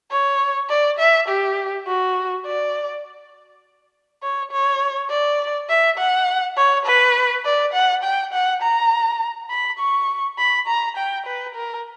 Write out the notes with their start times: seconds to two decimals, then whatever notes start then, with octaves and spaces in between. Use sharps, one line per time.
0.11 C#5
0.69 D5
0.99 E5
1.29 G4
1.88 F#4
2.46 D5
4.23 C#5
4.51 C#5
5.10 D5
5.69 E5
5.98 F#5
6.57 C#5
6.86 B4
7.45 D5
7.74 F#5
8.04 G5
8.33 F#5
8.62 A#5
9.50 B5
9.79 C#6
10.39 B5
10.68 A#5
10.97 G5
11.26 B4
11.55 A#4